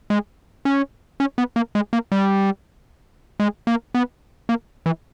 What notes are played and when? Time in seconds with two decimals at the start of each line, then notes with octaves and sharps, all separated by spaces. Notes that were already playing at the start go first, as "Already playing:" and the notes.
0.10 G#3
0.65 C#4
1.20 C#4
1.38 B3
1.56 A#3
1.75 G#3
1.93 A#3
2.12 G3
3.40 G#3
3.67 A#3
3.95 B3
4.49 A#3
4.86 E3